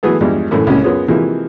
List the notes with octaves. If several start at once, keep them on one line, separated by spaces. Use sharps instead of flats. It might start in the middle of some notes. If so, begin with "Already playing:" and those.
E3 F#3 A3 B3 G#4 A4
E2 G2 F3 G3 G#3
F#2 A2 E3 A3 A4
C#2 A2 C3 A#3 C#4
F#2 B3 F4 G#4 C#5
C3 E3 F3 G#3 A#3